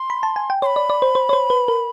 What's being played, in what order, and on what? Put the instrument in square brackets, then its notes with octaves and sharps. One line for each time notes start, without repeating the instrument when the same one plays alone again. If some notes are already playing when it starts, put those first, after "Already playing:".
Already playing: [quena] C6
[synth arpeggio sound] B5
A5
G#5
G5
[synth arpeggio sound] C#5 [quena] C6
[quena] B5
[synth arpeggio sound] D5
D5
C5
C5
C#5
C5
B4
A#4